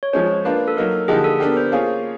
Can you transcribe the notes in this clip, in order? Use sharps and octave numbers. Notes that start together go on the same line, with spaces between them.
C#5
F3 G#3 C#4 C5
A#3 D4 F4 B4
A4
F#3 A#3 D#4 A#4
D3 F3 A#3 D#4 G4 G#4
A4
B3 D4 G4 A#4
C5
A#3 C#4 F4 G#4